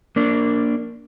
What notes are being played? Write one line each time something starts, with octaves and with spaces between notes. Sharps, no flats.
A#3 D4